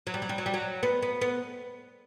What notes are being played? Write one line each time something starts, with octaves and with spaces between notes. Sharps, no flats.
F#3
G3
F#3
G3
F#3
G3
F#3
B3
B3
B3